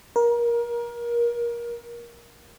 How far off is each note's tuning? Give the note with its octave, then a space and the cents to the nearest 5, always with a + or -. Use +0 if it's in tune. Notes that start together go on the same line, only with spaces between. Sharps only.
A#4 +25